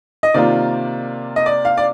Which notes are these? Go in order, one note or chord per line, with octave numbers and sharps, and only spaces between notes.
D#5
C3 D#3 A#3 F4 D5
D#5
D5
F5
D5